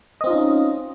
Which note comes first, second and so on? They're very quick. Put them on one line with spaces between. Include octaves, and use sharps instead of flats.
D#5 C4 F4 D#4 C#4